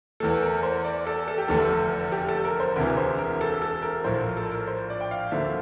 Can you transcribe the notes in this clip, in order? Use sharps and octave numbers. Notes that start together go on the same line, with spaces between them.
E2 E3 A3 A4
A#4
C5
D5
A4
A4
G4
F1 E2 D3 A3 A4
G4
A4
A#4
C5
E1 D2 C3 E3 A#4
C5
A#4
A4
A4
A#4
A#1 A2 F3 C5
A#4
A4
A#4
C5
D5
G5
F5
D2 D3 F3 A#3 E5